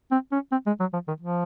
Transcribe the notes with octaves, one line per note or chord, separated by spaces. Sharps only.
C4
C#4
C4
G#3
F#3
F3
D#3
F3